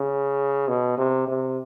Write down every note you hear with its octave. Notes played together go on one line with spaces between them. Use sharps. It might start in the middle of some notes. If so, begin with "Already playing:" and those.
Already playing: C#3
B2
C3
C3